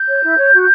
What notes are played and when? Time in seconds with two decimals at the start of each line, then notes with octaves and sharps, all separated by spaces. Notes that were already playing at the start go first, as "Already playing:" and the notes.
Already playing: G6
0.09 C#5
0.23 E4
0.38 C#5
0.53 F#4